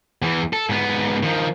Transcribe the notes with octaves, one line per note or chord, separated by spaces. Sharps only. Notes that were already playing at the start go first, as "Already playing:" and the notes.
E2 E3
A4
G#2 B3
D#3 F3